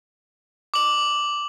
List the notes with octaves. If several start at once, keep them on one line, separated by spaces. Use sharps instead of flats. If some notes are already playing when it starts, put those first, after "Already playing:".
D6 F#7